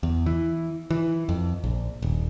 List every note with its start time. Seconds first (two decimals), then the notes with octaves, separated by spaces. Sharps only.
0.03 E2
0.26 E3
0.91 E3
1.29 F2
1.64 A#1
2.02 D#1